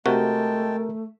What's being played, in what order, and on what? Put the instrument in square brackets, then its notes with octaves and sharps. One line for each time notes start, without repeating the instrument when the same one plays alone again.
[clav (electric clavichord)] C3 F#4 [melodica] G#3 G5 A5 [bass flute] A3 [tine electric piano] A#4